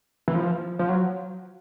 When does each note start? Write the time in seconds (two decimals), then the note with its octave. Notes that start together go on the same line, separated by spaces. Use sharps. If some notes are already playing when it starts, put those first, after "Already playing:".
0.28 E3
0.35 F3
0.79 F3
0.89 F#3